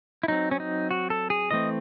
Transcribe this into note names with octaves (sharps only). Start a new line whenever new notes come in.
E4
F#3 C4 D#4
C#4
D#4
F#4
A4
G#4
E3 A3 C4 D#5